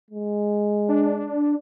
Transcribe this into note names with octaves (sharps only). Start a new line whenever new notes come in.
G#3
D4